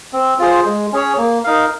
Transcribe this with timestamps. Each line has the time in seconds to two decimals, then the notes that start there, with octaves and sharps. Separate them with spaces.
0.13 C4
0.39 F4 G#4 C5
0.65 G#3
0.92 C#4 G#4 C#5
1.18 A#3
1.44 D#4 A#4 F5